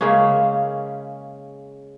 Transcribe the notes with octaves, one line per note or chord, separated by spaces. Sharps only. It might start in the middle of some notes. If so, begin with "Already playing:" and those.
C#3 G#3 A#3 C#4